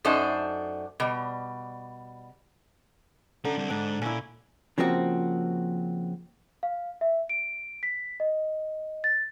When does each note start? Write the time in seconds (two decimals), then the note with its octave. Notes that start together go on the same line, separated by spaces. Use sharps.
0.05 F#2 A3 D4 D#4 C5 A5
1.00 B2 G3
3.45 D3 C#4 A#5
3.58 G3 C4
3.70 G#2 D4
4.01 A#2 C#4 E4
4.78 C#3 F3 A#3 C4 F#4
6.63 F5
7.01 E5
7.29 D7
7.83 B6
8.20 D#5
9.04 A6